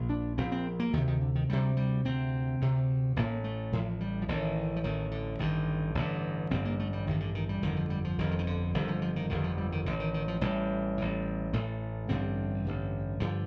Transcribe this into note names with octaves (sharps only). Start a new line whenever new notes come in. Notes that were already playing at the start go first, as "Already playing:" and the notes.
Already playing: A#1 A#2
D4
A#1 A#2 C4
C4
A#3
D2 C3 D#3
D#3
D3
D#3
D2 C3 G3
G3
D2 C3 C4
D2 C3
A1 A2 A#3
A3
A1 A2 F3
G3
F3
A1 A2 D#3
F3
A1 A2 D#3
D3
A1 G2 D3 D#3
A1 G2 D3 D#3
A1 G2 D3 C4
A#3
A3
G3
A1 G2 D3 D#3
D3
D#3
G3
G1 F2 D3 D#3
F3
G3
F3
G1 F2 D3 D#3
F3
D#3
D3
G1 F2 D3 D#3
F3
F3
D#3
G1 F2 D3 D#3
F3
G3
D#3
A1 A2 D3
D#3
D#3
F3
A1 A2 G3
A1 A2
A1 A2 A3
A1 G2 D3 C4
A1 G2 D3
G2 D3 F3